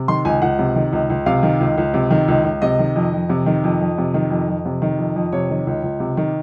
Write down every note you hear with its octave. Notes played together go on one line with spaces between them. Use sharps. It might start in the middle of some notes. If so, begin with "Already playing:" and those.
Already playing: C3
D#3 C6
C#2 G#5
C#2 F#5
C3
D#3
C#2
C#2
C3 F5
D#3
C#2
C#2
C3
D#3
C#2
C#2
C3 D#5
D#3
F2
F2
C3
D#3
F2
F2
C3
D#3
F2
F2
C3
D#3
F2
F2
C3 C#5
D#3
C#2
C#2
C3
D#3